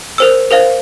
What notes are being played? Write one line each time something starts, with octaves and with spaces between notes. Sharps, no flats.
A#4 C5 E6
A#4 C5 F5